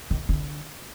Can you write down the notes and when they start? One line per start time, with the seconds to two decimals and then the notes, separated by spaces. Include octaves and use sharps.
0.11 D#3
0.29 D3